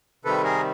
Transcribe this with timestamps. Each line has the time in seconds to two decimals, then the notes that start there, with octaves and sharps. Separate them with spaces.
0.24 C3 D#3 G3 A4 B4
0.44 G#4 A#4